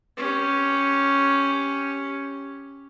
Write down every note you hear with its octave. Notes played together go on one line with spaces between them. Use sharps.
C#4 G4